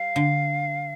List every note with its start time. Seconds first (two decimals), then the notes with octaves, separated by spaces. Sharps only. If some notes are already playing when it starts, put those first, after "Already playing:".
Already playing: G3 F5
0.16 D3